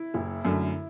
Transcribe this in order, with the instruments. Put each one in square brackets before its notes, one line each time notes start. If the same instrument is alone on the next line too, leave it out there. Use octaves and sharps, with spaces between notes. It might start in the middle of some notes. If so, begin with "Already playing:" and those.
Already playing: [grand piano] E4
[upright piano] F#1
F#2 D3 F#3 A3